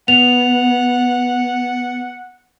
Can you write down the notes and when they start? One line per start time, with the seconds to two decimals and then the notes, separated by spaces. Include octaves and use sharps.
0.08 B3 F#5 F7